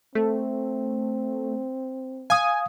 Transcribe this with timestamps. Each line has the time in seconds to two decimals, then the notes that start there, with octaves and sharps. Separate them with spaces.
0.15 A3 C4
2.30 F5 G#5 D#6